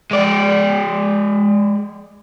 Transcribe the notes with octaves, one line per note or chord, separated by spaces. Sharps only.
G#3 D5